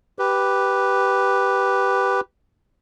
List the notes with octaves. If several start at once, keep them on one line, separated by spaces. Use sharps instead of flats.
G4 B4